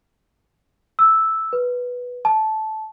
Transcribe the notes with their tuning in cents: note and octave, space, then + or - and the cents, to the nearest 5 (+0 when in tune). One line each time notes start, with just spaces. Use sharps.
E6 -5
B4 -5
A5 -15